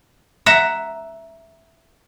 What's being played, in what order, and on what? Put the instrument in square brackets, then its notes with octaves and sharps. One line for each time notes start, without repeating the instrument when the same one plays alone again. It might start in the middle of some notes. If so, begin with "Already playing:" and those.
[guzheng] E5 F#5 A#5